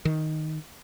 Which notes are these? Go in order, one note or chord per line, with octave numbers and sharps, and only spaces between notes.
D#3